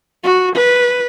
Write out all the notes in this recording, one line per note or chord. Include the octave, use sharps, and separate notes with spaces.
F#4
B4